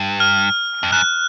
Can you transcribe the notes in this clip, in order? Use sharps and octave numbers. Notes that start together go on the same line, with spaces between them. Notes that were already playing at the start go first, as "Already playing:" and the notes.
Already playing: G2
F6
F2
F#2 F#6